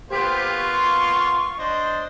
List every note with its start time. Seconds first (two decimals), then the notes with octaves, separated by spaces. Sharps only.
0.10 A#3 B3 F4 G4 C5
0.56 C6 C#6
1.59 D4 C5 D#5